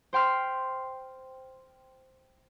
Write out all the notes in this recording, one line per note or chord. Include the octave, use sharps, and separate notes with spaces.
C5 G5 C6 F6 B6